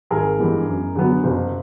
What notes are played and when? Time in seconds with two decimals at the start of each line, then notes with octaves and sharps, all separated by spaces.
0.10 G#1 G#4 A#4
0.39 G2 E3 G#3 B3
0.66 F#2
0.95 D3 F#3 B3
1.24 F#1